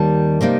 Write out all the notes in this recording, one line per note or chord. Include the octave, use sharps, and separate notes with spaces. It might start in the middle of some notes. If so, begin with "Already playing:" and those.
Already playing: D#2 D#3 G3 A5
C3 G3 A#3 D#4